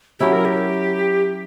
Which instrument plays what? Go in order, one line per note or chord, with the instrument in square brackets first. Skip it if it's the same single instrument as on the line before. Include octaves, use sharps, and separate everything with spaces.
[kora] F#3 C#4 E4 [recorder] G4
[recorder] A#4
G4